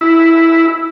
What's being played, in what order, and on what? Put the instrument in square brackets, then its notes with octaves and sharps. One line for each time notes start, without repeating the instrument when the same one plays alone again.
[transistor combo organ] E4